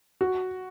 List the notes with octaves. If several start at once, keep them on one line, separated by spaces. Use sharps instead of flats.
F#4